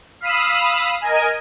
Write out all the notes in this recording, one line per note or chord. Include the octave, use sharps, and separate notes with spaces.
F5 B5 D#6 E6
A#4 D#5 G#5